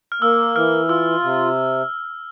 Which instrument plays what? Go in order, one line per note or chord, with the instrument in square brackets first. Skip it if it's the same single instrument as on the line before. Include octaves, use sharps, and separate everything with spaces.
[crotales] F6
[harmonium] A#3 [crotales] E6
[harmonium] E3 [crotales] F6
[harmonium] F4 [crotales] E6
[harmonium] C3